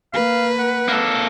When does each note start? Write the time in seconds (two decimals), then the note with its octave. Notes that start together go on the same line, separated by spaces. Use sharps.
0.13 A#3 B4 F5
0.59 F#5
0.88 A#3 A4